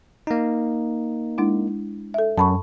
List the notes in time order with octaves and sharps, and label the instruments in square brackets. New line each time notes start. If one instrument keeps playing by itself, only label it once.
[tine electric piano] A#3 D#4
[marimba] G#3 D4 E4
A4 E5
[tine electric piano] F#2 [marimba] A5 B5 C#6